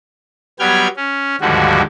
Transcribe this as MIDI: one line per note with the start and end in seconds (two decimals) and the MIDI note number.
0.60 0.88 54
0.60 0.88 55
0.60 0.88 59
0.60 0.88 79
0.60 0.88 89
0.60 0.88 92
0.96 1.36 61
1.41 1.82 39
1.41 1.82 44
1.41 1.82 50
1.41 1.82 53
1.41 1.82 55
1.41 1.82 66